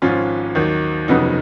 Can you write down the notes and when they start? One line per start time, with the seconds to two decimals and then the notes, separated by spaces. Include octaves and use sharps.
0.02 G#1 G#2 F3 C#4 F4
0.55 D#2 D#3 F#3
1.08 F1 F2 C#3 F#3 B3 D#4